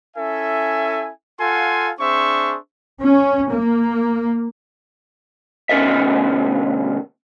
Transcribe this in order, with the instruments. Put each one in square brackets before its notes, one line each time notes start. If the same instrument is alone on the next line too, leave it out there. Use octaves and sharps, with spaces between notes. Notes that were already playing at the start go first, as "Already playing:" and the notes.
[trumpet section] C#4 E4 A4 E5 G#5
F4 A4 F5 F#5 G#5 C6
C4 D4 G#4 C5 E5 C#6
[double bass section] C#4
A#3
[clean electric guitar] D2 B2 C#4 A#4 D#5 E5